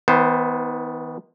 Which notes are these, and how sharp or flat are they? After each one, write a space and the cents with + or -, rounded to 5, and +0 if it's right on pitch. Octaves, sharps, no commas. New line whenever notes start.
D#3 +45 B3 +0 C5 +0